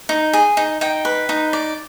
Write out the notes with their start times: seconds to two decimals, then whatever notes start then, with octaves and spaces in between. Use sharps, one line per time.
0.09 D#4
0.33 G#4
0.57 D#4
0.81 D#4 G5
1.05 B4
1.29 D#4
1.53 D5